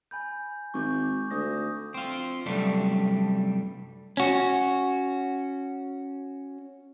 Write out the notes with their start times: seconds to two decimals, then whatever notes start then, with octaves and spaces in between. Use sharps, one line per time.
0.11 G#5 B5 G6
0.74 G#1 C#6 D6 G6
1.31 D2 D#6 G6 A#6
1.94 C4 F4
2.46 C2 F#2 G3 A3 D4
4.17 C#4 F#4